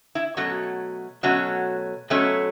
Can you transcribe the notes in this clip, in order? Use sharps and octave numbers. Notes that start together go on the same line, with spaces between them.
E4
B2 F#3 A3 C#4 F#4
B2 F#3 A3 C#4 F#4
B2 F#3 A3 C#4